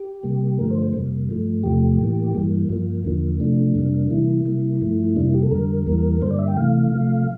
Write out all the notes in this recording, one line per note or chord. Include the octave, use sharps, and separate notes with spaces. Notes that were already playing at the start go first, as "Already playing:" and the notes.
Already playing: G4
C3 G3 A#3
G2 D3 F3 A3 A#4
C5
C5
F2 C3 G3 A#3
G2 F3 A3
E2 C3 F3 A3 G4
A2 E3 A#3
G2 E3 G3 A#3
G2 F3 A#3
E2 D3 F3 A#3
C3 F3 A3 D4
F2 C3 G3 A#3
C3 E3 G3 A#3 E4
C3 G3 A#3
G2 F3 A3
F2 C3 G3 A#3 D4
E4
G4
A4
F2 D3 G3 A#4
E2 E3 G3 A#3
G2 D3 G3 A#3 C5
D5
E5
G5
C3 E3 A3 F5
C3 F3 A3